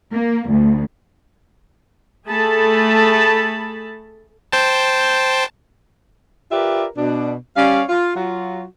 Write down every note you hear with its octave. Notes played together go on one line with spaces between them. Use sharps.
A#3
D2
A3 G#4 A4 A5 B5
C5 G5 A5
F4 G4 A#4 B4 D5 E5
B2 D4
G3 C#4 C#5 D5 F5
F4
F#3 F4 F#4